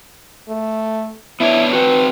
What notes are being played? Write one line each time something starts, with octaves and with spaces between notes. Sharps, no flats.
A3
B3 D4 E4 C#5
C4 F#4 B4